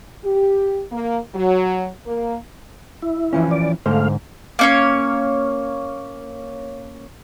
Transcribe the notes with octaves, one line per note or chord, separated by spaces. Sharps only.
G4
A#3
F#3
A#3
E4
E3 F3 C#4
D5
G#2 D3 A3 C5 F5
A#3 C#4 C#5